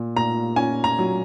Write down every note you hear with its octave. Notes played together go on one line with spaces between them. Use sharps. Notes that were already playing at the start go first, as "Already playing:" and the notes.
Already playing: A#2
A#2 A#5
C#4 G#5
A#5
F#3